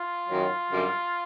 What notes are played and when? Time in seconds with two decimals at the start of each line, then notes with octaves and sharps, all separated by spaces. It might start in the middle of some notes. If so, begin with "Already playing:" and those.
Already playing: F4
0.29 F#2 D#3 F#3
0.71 F#2 D3 G3